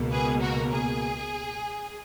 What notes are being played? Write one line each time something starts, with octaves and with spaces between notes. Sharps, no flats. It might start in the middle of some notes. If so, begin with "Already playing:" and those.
Already playing: C#2 B2 A#3
G#4 B4
F#4 A#4
G#4